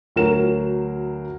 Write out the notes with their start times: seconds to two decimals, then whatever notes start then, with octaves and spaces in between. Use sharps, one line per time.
0.16 D2 F#3 A#4 E7